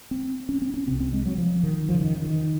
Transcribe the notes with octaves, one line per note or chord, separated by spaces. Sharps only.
C4
C#4
C4
C#4
C2 C3 C4
C4
G#3
F#3
F3
D#3
F2 C#3 F3
D#3
D#3